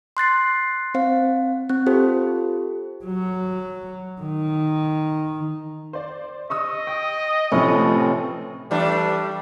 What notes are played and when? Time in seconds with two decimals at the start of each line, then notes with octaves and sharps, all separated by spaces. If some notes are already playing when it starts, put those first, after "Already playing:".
0.17 C6 F#6 A6 C7
0.94 C4 C5 F5
1.69 C4
1.87 F4 G4 A4 C5
3.05 F#3
4.21 D#3
5.93 C5 D5
6.50 D#5 C#6 D#6 E6
6.87 G5
7.51 A2 C3 F3 A3 C#4 B4
8.71 E3 G3 A3 D4